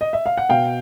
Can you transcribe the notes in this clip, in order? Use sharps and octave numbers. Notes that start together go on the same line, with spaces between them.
D#5
E5
F5
F#5
B2 F5 G5